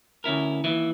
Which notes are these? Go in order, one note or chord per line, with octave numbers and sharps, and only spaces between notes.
D2 C#4 E4 A#4
D#2 E3 E4